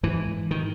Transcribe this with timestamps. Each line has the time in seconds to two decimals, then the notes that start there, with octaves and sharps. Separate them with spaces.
0.03 G#2 E3
0.51 D#3